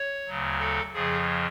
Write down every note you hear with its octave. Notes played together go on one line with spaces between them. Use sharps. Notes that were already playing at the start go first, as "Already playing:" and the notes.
Already playing: C#5
D2 C#3 F#3
A4
F2 C#3 F3 G#4